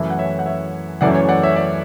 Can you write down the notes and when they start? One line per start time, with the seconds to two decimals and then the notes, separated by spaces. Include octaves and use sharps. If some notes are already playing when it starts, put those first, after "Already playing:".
Already playing: F#2 E3 A3 E4
0.10 F#5
0.18 C#5 E5
0.39 F#5
0.46 C#5 E5
1.01 F#2 E3 A3 C#4 E4 D5 F#5
1.15 C#5
1.29 D5 F#5
1.43 C#5 E5
1.56 D5